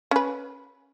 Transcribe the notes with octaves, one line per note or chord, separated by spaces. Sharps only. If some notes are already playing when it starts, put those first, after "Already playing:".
C#4 B4